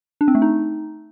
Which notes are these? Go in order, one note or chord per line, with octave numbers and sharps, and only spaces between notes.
D4
C4
A3
D#4